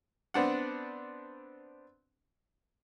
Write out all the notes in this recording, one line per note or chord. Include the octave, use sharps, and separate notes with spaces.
B3 C4 D4 F#5